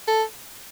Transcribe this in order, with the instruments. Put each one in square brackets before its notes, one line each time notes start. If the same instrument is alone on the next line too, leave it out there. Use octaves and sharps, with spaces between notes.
[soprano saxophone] A4